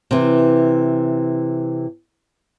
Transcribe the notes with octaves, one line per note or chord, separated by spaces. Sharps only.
C3 E3